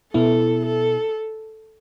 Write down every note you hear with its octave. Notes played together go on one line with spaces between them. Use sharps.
B2 B3 E4 A4
A4